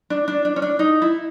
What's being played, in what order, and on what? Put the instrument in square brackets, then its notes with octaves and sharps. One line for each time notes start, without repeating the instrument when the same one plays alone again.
[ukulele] D4
D4
D4
C#4
D4
D#4
E4